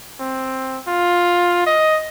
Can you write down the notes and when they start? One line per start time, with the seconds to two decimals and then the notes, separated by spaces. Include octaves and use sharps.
0.20 C4
0.88 F4
1.67 D#5